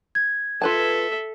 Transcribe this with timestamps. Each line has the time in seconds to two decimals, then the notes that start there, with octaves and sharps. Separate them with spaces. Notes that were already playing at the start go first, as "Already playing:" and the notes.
0.15 G#6
0.62 F4 A4 B4 E5 A5